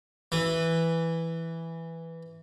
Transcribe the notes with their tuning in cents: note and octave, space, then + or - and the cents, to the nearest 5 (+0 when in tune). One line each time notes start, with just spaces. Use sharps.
E3 +0 B4 +0